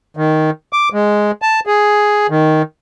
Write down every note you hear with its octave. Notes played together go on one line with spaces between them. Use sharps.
D#3
D6
G#3
A5
G#4
D#3